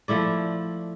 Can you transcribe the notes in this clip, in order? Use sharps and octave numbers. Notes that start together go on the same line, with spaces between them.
F3 A3 E4 D5